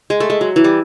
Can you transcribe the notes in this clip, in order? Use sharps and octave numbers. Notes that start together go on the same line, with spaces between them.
G#3
A3
G#3
F#3
E3
G3